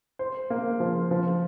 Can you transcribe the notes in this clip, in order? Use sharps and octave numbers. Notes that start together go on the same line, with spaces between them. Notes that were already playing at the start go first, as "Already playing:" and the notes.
C5
A#3
F3
F3